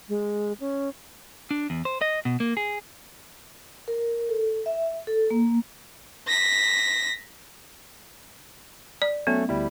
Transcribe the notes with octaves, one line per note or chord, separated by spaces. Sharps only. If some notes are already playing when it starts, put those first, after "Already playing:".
G#3
C#4
D4
E2
C5
D#5
B2
A#3
G#4
A#4
A4
E5
A4
A#3
A#6 B6
D5
F#3 A3 B3 C#4
D2 G3 E4